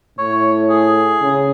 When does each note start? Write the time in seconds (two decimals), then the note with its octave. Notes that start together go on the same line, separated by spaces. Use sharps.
0.18 A2 C#5
0.70 G#4
1.22 C#3